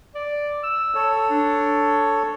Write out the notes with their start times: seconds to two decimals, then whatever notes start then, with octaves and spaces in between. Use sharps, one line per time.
0.15 D5
0.64 E6
0.95 A4 C#5
1.30 D4